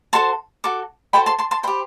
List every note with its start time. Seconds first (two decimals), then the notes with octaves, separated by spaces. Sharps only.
0.13 F#4 A4 C5 A5 C6
0.64 F#4 A4 D6
1.13 F#4 A4 C5 G5 B5
1.26 A5 C6
1.39 A5 C6
1.51 A5 C6
1.63 G4 C5 G5 B5